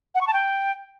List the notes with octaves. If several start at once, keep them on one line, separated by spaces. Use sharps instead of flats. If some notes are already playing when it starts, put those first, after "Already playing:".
F#5
C#6
A5
G5